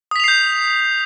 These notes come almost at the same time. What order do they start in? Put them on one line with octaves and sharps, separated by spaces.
D#6 B6 F7 C7 G6